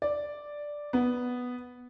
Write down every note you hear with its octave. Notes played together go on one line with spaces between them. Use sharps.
D5
B3